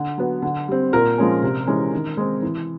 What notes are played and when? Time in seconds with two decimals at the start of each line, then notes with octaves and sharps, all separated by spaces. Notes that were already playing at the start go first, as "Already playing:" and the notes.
Already playing: D3
0.18 F#3 B3
0.42 D3
0.68 G3 C4
0.93 A#2 A#4
1.18 F3 G#3 C#4
1.42 C3
1.67 E3 G#3 C#4
1.93 D#3
2.17 G#3 C4
2.42 E3